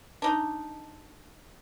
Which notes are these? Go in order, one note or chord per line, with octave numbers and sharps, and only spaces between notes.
D4 D#4